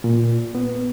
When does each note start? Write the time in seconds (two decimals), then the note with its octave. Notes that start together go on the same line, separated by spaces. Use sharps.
0.04 A#2
0.55 B3